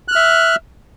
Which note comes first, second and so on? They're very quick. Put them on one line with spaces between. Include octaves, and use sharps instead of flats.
F#6 F6 E5